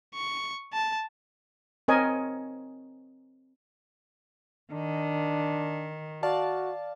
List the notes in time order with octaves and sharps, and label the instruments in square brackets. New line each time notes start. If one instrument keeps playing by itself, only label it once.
[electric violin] C#6
A5
[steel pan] C4 A#4 C#5 D#5 G#5
[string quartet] D#3 [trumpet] D4
[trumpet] F#4 [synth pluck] D5 F5 A5